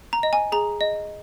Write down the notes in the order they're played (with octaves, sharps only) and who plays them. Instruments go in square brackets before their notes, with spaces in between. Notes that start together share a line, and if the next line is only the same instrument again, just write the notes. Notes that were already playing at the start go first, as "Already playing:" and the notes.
[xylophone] A#5
D#5
G#5
G#4 A#5
D#5